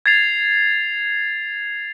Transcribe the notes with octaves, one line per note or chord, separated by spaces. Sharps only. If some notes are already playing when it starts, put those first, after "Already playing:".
G#6 A6 C7 F7